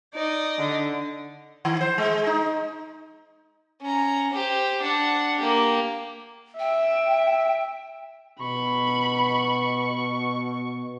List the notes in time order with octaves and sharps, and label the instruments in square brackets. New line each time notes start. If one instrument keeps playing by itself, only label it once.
[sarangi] D#4 [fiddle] D5 D#5
[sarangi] D3
[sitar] D#3
C5
G#3
D#4
[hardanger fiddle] C#4 A#5
G4 C5
D4 F#5
A#3 G4
[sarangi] E5 [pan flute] G5
[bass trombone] B2 [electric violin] B5 [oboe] C#6